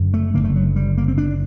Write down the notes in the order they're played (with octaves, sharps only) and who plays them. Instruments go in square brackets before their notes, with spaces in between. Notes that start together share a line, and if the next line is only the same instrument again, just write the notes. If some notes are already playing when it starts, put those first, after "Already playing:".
Already playing: [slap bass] F#1 F#2 D3
A3
F#1 F#2 D3 A#3
A3
F#3
G3
A#3
C4
D4